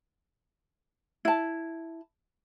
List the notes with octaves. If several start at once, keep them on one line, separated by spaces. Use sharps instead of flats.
E4 A5